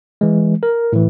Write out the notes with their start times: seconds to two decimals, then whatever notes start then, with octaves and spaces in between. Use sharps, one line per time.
0.21 E3 G#3
0.63 A#4
0.93 A2 E3